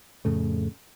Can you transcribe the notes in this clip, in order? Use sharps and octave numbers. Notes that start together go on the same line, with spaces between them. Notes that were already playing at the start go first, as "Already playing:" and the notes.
F2 A2 C#3 A3